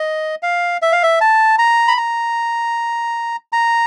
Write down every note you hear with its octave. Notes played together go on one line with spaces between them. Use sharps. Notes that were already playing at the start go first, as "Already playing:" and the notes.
Already playing: D#5
F5
E5
F5
E5
A5
A#5
B5
A#5
A#5